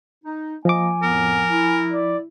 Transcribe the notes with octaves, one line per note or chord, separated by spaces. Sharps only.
D#4
F3 A#3 D#5 G#5 D6
F2 A2 B3 A#4
E4
D5